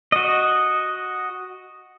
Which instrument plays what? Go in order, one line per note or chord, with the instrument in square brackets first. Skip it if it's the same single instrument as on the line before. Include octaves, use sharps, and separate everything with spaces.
[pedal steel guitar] F#4 D#5